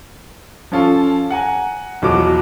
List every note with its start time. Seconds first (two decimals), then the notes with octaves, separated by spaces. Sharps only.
0.72 F3 C#4 F4 A4
1.31 F#5 G#5 A#5
2.02 B1 E2 F3 F#3 F#4 D6